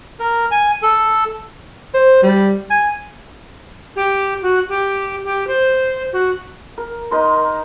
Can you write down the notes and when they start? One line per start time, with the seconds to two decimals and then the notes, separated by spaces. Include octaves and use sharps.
0.20 A#4
0.51 G#5
0.83 A4
1.94 C5
2.23 G3
2.70 G#5
3.96 G4
4.42 F#4
4.69 G4
5.24 G4
5.47 C5
6.13 F#4
6.78 A#4
7.11 D#4 A#4 C6